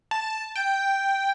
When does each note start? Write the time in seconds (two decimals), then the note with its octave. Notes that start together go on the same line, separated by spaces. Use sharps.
0.11 A5
0.56 G5